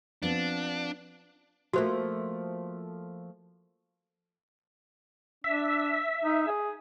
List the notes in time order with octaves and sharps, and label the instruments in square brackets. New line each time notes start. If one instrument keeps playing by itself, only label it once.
[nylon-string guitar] F3 B3 C4 [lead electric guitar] D4
[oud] F3 A3 A#3 [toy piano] F#4 C5
[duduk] D4 [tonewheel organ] E5
[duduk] D#4
G#4